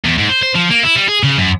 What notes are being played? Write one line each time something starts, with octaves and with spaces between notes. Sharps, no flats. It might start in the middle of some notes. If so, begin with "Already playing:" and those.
E2
G#2
C5
C5
F3
A#3
E4
G3
G#4
C#3
F#2